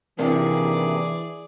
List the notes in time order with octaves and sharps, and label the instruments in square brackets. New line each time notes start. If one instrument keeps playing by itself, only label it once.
[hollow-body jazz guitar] C3 [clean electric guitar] D#3 A#3 D4 [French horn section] E3 [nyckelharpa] G#4 D5